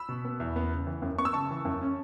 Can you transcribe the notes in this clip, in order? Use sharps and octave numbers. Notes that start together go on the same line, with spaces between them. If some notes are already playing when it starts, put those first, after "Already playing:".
Already playing: B5 E6
B2
B3
E2
B3
C#3
E3
F#2
B3 C#6
E6
C#3 A5 C#6
E3
F#2
C#4